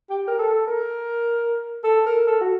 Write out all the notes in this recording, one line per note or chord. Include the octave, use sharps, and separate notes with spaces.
G4
A#4
A4
A#4
A4
A#4
A4
F#4